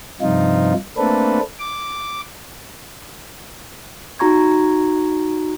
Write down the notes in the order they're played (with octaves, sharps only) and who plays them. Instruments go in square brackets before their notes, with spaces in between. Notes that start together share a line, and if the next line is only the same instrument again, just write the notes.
[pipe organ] G2 C3 F3 D#4 F4
A3 A#3 C4 D4 A4 B4
D6
[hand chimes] D#4 F#4 A#5 C#6 G#6